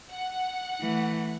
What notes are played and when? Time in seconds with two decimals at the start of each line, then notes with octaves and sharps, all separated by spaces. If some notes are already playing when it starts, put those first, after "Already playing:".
0.12 F#5
0.82 E3 A3